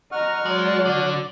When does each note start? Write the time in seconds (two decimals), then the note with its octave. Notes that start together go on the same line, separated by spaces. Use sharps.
0.12 D#5 F#5 A#5 C#6 F6
0.46 F#3 G#3 D5
0.85 D3